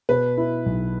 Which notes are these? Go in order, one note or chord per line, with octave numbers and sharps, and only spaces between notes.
B2 B4
E4
B1